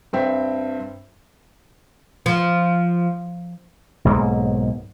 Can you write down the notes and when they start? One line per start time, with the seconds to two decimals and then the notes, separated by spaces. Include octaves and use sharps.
0.13 G2 C4 E5 G5
2.26 F3
4.05 B1 G#2 A#3